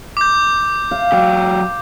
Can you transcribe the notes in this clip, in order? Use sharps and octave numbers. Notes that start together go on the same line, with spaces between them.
D6 G6
F5
F#3 G4